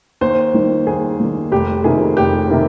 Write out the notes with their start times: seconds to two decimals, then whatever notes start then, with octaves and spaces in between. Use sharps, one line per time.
0.21 D#2 C5
0.54 D#3 G3
0.87 D#2 G#4
1.20 D#3 G3
1.52 F1 G4
1.84 F2 C3 D#3 A#3 G#4
2.17 F1 G4
2.50 C3 D#3 A#3